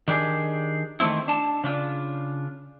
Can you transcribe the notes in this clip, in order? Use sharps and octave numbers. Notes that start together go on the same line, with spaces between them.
D#3 D4 G4 G#4
D#3 E3 A3 C4 E4
D4 A5
C#3 D4 F4